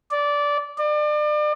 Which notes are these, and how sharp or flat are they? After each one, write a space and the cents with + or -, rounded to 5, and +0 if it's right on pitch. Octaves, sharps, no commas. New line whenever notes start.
D5 -15
D5 +35